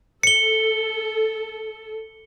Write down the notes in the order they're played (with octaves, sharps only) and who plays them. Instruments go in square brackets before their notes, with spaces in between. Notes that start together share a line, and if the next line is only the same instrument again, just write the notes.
[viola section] A4 [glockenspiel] C#7 G7